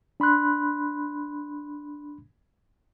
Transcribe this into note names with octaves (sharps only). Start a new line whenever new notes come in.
D4 B5 C6 F#6